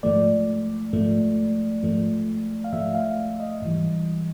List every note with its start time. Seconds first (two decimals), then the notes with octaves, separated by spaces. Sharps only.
0.03 G#2 F3 A3 D5
0.93 G#2 F3 A3
1.83 G#2 F3 A3
2.64 F5
2.72 G#2 F3 A3 E5
2.95 F5
3.40 D#5
3.62 G#2 E3 G3